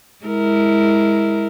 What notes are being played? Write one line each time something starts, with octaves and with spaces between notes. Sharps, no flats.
G#3 E4 A#4